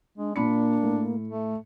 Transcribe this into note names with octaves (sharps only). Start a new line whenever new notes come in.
G#3 D4
A#2 A#3 D4 B5 C#7
A2
A3